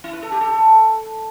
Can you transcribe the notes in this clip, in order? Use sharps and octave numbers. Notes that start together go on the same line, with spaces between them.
E4
B4
A4
G4
A4